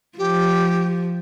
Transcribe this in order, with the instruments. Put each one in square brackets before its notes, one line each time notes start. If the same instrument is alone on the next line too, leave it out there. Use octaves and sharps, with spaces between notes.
[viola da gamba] F3 [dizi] G4